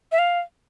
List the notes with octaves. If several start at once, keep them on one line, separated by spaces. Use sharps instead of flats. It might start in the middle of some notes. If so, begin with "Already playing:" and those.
E5
F5